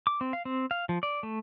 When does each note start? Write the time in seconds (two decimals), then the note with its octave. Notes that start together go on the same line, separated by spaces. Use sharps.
0.07 D6
0.21 C4
0.33 F5
0.45 C4
0.71 F5
0.89 F3
1.03 D5
1.23 A3